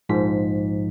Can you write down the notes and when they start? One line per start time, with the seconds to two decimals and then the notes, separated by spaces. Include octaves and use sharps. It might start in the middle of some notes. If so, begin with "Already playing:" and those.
0.09 A#1 G#2 F3 B6